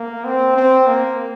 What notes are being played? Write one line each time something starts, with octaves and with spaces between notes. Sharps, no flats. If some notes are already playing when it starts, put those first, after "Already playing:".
Already playing: A#3
C4
C4
A#3